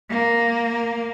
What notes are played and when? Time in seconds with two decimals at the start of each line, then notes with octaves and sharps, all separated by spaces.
0.10 A#3